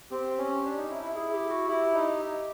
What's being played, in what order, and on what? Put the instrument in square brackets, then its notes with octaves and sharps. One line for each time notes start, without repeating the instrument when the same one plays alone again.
[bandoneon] C4 [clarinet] G4
[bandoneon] C#4
D4
D#4
E4
E4
[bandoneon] E4 [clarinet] G#4
[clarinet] G4
F#4
[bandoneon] E4 [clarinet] G4
[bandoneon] D#4